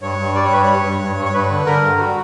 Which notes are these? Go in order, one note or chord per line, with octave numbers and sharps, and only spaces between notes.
G2 C#5
G2
G3 D5
C#5
G2 B4
G2 C#5
G2
G2
G2
C#5
G2 B4
D3
D3 A#4
G2
G3 F#4